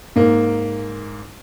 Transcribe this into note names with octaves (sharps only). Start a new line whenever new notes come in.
G#2 A#3